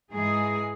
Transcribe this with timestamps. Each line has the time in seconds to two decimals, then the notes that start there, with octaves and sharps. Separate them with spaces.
0.12 G#2 E3 G#3 G#4